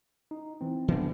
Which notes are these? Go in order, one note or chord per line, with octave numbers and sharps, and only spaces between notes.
D#4
E3 C4
D3 E3 B3 C4 D4